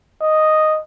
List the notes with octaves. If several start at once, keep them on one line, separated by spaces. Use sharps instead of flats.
D#5